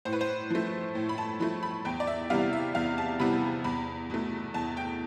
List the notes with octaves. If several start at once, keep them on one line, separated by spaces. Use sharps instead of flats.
A2 C5
B4
C5
F3 A3
A2
B5
A5
F3 A3 B5
B5
E2 G5
D5
E5
C3 E3 G3 B3 F5
E5
E2 F5
A5
C3 E3 G3 B3 B5
E2 B5
B2 A3
E2 A5
G5